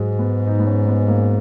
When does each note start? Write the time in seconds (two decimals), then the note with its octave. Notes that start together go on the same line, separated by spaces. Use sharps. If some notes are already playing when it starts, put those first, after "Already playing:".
Already playing: G#2 F#3 G#3
0.19 B3
0.47 D#4
0.59 B3
0.66 C#4
0.87 B3
1.03 B3
1.08 A#3